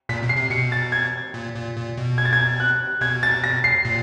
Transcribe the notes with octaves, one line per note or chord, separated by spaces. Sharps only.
A#2 B6
B2
C7
C3
B2 C#7
A6
G#6
A#2
A#2
A#2
B2
G#6
A6
G#6
F#6
B2 G#6
A6
A#6
C7
A#2